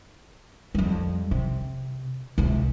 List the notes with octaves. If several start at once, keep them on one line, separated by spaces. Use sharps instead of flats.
F2 G3
C3
C#2 C3